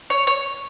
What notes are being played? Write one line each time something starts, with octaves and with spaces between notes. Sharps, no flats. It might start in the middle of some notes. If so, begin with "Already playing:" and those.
C#5
C#5